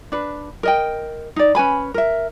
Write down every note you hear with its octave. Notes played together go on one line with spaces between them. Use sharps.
D4 B4
A#4 D#5 G5
D#4 D5
C#4 B4 G#5 B5
A#4 E5